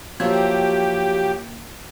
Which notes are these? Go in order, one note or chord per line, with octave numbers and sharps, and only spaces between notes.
F3 F#3 A#3 G4 G#6